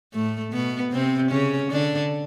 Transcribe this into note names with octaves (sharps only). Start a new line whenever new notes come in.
A2 A3
B2 B3
C3 C4
C#3 C#4
D3 D4